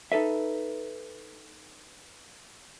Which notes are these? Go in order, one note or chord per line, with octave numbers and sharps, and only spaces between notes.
D#4 A4 B4 E5